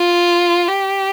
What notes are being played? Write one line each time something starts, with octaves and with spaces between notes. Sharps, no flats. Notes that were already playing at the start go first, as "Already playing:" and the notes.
Already playing: F4
G4